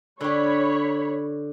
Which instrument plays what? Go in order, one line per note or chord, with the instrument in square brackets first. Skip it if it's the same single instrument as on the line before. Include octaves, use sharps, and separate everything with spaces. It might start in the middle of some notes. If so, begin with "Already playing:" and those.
[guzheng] D3 G4 [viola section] C#5 B5